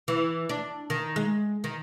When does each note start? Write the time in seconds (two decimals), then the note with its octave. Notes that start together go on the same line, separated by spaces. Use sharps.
0.08 E3
0.49 D4
0.90 D#3
1.16 G#3
1.64 D#3